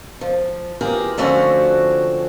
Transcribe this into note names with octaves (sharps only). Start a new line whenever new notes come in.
F3
E3 F4 G4 G#4 A#4
D3 F3 A3 C4 C#4 F#4